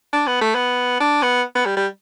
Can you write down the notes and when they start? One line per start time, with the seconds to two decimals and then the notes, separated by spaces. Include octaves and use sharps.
0.13 D4
0.27 B3
0.41 A3
0.55 B3
1.00 D4
1.23 B3
1.55 B3
1.66 G3
1.77 G3